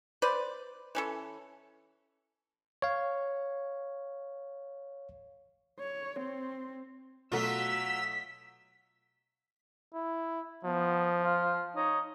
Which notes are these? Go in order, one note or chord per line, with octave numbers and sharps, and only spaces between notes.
B4 C5 D5
E3 C#4 A4
C#5 F5
C#5
C4
B2 F#3 A3 F4 E6 B6
E4
F3 B3
F4
D#4 C#5